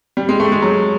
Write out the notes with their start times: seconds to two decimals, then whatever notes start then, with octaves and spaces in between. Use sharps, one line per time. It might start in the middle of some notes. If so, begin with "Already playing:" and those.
0.17 G3
0.29 G#3
0.40 A3
0.52 G#3
0.62 F#3